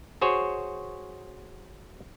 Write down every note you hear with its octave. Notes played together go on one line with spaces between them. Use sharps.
F#4 G#4 C5 C#5